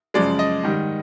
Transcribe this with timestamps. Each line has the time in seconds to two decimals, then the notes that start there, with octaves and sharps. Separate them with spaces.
0.14 F#2 C#3 F3 G#3 D5
0.39 D#5
0.64 G#2 D#3 G3